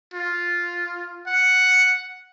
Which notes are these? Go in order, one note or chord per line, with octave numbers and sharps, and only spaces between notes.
F4
F#5